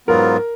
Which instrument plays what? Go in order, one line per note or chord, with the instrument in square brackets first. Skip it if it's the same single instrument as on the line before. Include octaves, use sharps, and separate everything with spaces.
[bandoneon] G#2 F#3 B3 F4 [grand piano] A#4